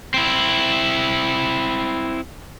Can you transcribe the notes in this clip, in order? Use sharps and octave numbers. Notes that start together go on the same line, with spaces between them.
C4 E4